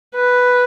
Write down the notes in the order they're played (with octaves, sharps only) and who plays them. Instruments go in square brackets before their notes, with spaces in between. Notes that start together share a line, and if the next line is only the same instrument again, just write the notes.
[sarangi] B4